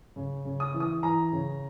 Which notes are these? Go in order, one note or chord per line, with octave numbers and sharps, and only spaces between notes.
C#3
C#3
D#6
E3
D#6
E3 A#5
C#3